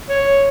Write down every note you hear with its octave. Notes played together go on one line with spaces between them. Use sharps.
C#5